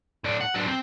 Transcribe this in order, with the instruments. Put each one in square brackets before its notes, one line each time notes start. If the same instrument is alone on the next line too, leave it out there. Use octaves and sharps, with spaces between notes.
[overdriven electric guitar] A2 D4
F#5
F#3 D4
C4